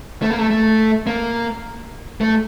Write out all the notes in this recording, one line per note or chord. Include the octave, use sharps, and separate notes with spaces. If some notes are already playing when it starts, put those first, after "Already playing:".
A3
A#3
A3
A3
A#3
A3